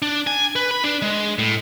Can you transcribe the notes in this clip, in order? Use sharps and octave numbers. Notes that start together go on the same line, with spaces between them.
D4
G#5
B4
B5
D4
G#3
A2